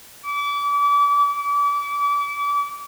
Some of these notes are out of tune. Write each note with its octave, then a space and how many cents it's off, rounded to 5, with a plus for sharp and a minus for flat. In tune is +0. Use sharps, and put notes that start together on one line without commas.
D6 -35